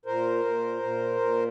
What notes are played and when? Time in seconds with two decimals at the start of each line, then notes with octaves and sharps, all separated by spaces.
0.05 A#2 A#4 C5
0.45 A#2
0.82 A#2
1.21 A#2